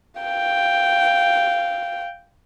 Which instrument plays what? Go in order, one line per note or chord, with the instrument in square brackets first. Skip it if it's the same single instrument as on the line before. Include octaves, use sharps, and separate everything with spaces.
[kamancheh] F5 G5